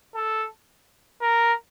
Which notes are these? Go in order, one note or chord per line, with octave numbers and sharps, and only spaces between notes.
A4
A#4